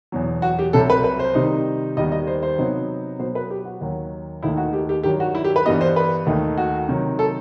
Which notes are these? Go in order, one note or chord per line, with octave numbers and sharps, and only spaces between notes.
E2 B2 F#3
F#4
G4
C2 C3 F#3 A4
B4
B4
C5
C3 D#3 G3 D#4
D#2 D#3 G3 B3 D#5
D#5
C5
C5
C3 F#3 B3 D#4
B2 F#3 B3 C5
B4
G4
F#4
D#2 D#3 F#3
D#2 D#3 A3 D#4 E4
F#4
G4
G4
G2 D#3 F#3 G4
F#4
E4
G4
B4
G2 E3 G3 B3 D#5
C5
B4
D#2 D#3 A3 D#4
F#4
C3 D#3 F#3
A4